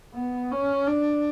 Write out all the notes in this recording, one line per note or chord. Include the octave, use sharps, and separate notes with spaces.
B3
C#4
D4